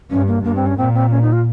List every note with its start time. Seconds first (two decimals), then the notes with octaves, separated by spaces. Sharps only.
0.10 G2 C#4
0.27 A#3
0.44 G2 A#3
0.56 C4
0.66 C#4
0.77 A#2 C4
0.94 C4
1.11 C#4
1.22 D#4
1.33 F4